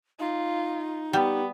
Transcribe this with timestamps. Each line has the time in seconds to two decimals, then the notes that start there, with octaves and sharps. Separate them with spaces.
0.19 D#4 F4
1.13 G3 B3 G4